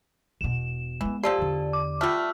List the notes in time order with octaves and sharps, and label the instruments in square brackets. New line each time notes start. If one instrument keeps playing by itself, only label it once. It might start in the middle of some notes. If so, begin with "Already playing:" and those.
[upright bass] E1 B2 [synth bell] E7
[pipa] E3 [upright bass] G#3 B3
[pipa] F3 A4 C6 [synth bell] G4 D5
[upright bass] E2 D3
[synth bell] D6
[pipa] G3 A3 [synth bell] F4 E6 F6